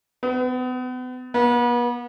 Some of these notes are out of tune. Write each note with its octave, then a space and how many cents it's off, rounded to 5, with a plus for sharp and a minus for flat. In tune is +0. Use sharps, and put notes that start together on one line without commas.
B3 +35
B3 -40